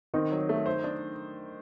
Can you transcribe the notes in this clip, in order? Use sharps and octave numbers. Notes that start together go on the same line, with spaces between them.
D#3 C4 D#4
F#3
A3
C5
D4